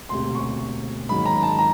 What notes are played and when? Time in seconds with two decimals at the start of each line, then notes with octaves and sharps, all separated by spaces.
0.09 E1 D2 C3 C6
0.35 C#6
1.09 G#2 D#3 F#3 A#3 B5
1.26 A#5
1.43 A5
1.59 A#5